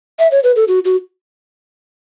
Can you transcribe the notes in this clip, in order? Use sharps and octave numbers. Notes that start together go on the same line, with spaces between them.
E5
C#5
B4
A4
F#4
F#4